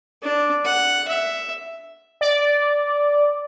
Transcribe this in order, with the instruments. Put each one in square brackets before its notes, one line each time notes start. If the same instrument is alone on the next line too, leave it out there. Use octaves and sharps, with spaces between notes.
[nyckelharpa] D4
F#5
E5
[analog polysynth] D5